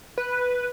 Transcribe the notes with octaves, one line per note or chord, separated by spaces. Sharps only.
B4